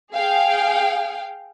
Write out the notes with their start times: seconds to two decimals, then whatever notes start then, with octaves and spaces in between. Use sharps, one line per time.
0.13 G#4 F5 G5